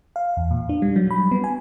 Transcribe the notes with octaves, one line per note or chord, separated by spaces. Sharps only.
F5
E2
A#2
D4
G3
F#3
B5
B3
G#5